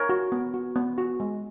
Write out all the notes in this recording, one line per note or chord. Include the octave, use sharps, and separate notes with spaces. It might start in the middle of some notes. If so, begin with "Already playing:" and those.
Already playing: A#4 C#5
F#4
B3
F#4
B3
F#4
G#3